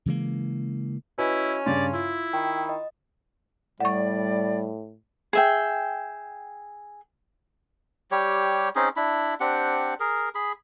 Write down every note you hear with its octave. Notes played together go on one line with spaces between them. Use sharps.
C#3 E3 G#3 A#3
C#4 E4 F#4 B4 D#5 G#5
G2 C#3 D5 C6
E4 F4
D#3 G5 B5
D#5
A2 G3 D5 F#5 C#6
G#4 E5 G5
G3 G4 C#5
C4 C#4 D#4 G#4
D4 E4 B5
C4 D4 G4 F#5
G#4 A#4
G#4 B5